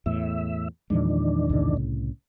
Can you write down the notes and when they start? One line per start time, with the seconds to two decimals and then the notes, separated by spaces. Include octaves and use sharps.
0.06 E2 A2 E5
0.90 E2 A#2 D#3 F3 G#3 D4
1.49 C2 A2 C#3